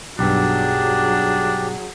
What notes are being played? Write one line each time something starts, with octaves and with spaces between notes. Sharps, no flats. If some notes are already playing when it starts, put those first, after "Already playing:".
B1 G2 F#3 D4 G4 G#4